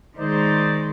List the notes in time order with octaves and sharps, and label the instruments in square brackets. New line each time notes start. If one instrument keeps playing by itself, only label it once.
[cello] D#3 G#3 [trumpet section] D#4 C5 D5